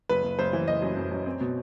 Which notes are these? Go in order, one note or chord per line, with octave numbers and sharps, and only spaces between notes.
F#1 B4
F#1
F#1 C5
E3
F#1 D#5
F#2
F#2
F#2
C4
B2